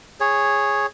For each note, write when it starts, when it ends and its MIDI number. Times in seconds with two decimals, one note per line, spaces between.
0.20 0.86 68
0.20 0.86 73